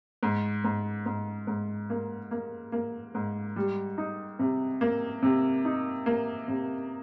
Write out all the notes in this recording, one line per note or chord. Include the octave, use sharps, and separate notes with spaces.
G#2
G#2
G#2
G#2
A#3
A#3
A#3
G#2
G3
D#4
C3
A#3
C3
D#4
A#3
C3